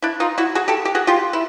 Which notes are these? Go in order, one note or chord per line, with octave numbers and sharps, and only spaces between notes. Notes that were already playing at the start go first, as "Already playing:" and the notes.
D4 E4
D#4 F4
E4 F#4
F#4 G#4
G4 A4
G4
F#4 G#4
F4 G4
E4